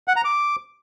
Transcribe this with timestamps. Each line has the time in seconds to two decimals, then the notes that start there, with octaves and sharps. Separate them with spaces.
0.08 F#5
0.16 A#5
0.25 D6